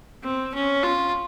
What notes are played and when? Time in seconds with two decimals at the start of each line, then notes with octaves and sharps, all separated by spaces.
0.23 C4
0.54 C#4
0.83 F4